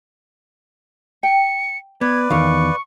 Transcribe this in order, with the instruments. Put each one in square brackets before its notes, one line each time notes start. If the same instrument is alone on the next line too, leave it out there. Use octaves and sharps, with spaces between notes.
[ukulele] G5 [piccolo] C#7
[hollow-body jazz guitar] B3 [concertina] B4 D5 [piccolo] G#6
[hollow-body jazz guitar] E2 D#3 [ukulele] A#4 F5 [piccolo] C#6